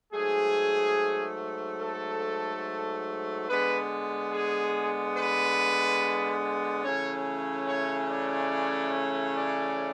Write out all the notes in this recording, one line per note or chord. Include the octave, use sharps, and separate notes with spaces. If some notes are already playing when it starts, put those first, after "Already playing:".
G#2 F#3 A3 G#4
A4
D3 G#3 B3 B4
G#4
B4
C#3 E3 A3 C#4 C#5
C#5
D5
D5